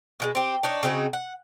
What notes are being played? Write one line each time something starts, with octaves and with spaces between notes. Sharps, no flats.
B2 E3 G#3
C4 G4
D4 D#4 C#5
C#3 C4 D#4 F#4
F#5